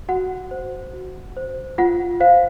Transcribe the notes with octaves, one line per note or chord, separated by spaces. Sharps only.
F#4 F#5
C5
F#4
C5
F4 F#5
C5 F5